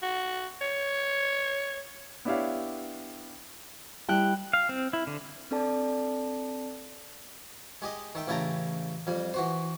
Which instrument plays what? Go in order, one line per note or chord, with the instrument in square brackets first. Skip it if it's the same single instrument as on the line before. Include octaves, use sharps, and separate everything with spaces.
[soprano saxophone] F#4
C#5
[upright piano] B3 D4 E4 G4 C#5 F5
[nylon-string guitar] G3 E4 A5 [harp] G5 F#6
[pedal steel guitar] F5
C4
E4
D3
[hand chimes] C4 D4 A4 D5 A5
[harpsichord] G#3 G4 D#5
D#3 E5 G5
A1 C#3 E4 G5 A5 A#5
F2 G3
E3 F#4 C5